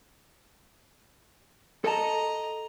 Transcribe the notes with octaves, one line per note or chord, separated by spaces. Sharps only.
A4 D#5 A5 A#5